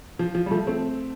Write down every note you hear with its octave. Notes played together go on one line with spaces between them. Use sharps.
F3
F3
G3
F3 A3
A3 C4